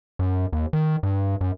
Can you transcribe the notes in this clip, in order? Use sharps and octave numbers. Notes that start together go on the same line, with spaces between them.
F#2
D#2
D#3
G2
F#2